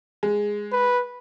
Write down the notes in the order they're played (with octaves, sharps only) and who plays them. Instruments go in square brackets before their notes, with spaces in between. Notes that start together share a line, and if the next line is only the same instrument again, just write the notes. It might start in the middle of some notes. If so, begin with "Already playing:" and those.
[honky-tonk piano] G#3
[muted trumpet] B4